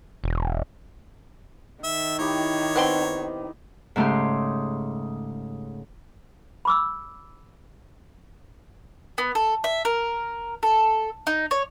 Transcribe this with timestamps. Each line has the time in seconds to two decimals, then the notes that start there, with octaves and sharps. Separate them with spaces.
0.24 E1
1.84 D#3 E5
2.19 D#4 E4 G4 C#5
2.76 B3 C4 C6
3.96 G#2 C#3 A3 G4 C6
6.65 B5 D6 E6
9.18 B3
9.35 A4
9.64 E5
9.85 A#4
10.63 A4
11.27 D#4
11.51 C#5